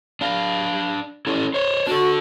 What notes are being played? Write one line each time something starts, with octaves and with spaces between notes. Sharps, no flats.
D4 F5
C#4 E4 A4
C5 C#5
D4 F#4 A4